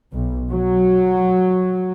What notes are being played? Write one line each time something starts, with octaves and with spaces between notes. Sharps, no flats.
B1
F#3